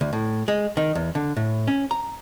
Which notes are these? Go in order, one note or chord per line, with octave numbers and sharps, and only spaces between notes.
D2
A2
G#3
D#3
E2
D3
A2
C#4
A#5